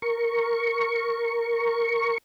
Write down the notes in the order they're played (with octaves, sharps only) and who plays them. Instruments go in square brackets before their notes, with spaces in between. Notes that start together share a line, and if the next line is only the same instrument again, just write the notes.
[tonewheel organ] A#4 C#6